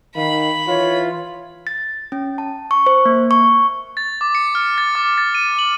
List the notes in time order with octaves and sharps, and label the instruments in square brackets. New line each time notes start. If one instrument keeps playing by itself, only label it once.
[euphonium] D#3 [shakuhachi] F5 [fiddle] B5
[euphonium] E3 [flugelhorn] F4 [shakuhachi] C#5
[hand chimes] A6
C#4
A5
C#6
C5
A#3
C#6
[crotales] A6
D6
C#7
F6
A6
D6
A6
D#7
F#7